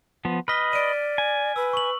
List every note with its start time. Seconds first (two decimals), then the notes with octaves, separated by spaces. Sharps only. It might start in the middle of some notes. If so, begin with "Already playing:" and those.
0.25 F3 B3
0.48 B4 D#5 F6 B6 G7
0.73 D5 D7 D#7
1.18 G#5
1.56 B4 E6
1.73 C#6 F#7